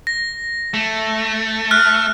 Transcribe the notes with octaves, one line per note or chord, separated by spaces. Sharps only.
A#6
A3
F6 F#6